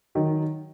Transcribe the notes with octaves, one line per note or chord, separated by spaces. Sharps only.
D#3 F#3